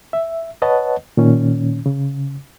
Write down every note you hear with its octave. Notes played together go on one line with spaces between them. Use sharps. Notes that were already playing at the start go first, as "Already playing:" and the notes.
E5
B4 C#5 D#5 F#5 A5
A#2 D#3 C#4
C#3